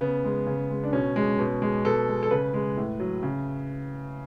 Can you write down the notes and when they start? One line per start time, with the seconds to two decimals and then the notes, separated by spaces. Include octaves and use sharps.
0.01 C#3 B3
0.24 G#3
0.46 C#3
0.70 G#3
0.84 D4
0.93 B2 C#4
1.16 G#3
1.39 B2
1.62 G#3
1.85 B2 A4
2.08 G#3
2.23 A4
2.31 C#3 B4
2.54 G#3
2.77 A2
3.00 F#3
3.23 C#3